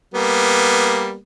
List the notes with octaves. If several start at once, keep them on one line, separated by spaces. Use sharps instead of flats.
G3 A#3 B3